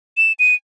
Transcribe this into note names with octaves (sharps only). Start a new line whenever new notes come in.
E7
D#7